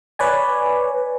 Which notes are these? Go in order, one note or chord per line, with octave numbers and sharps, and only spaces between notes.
B4 C#5 D5 G#5